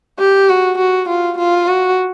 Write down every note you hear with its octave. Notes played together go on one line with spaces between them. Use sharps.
G4
F#4
F#4
F4
F4
F#4